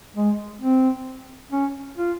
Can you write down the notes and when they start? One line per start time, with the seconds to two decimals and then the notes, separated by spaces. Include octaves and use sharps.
0.16 G#3
0.61 C4
1.52 C#4
1.98 F4